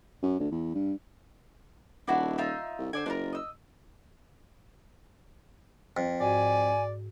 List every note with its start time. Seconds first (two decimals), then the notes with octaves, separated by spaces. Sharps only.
0.23 F#2
0.40 D2
0.51 E2
0.75 G2
2.07 D#1 D4 E4 F#4
2.38 D#4 F4 E5
2.78 C2
2.93 D3 C5 D5 G#5
3.06 F#1 D4 F4 A#4
3.33 D#5 E6
5.97 F2
6.21 G#2 F#4 D5 G#5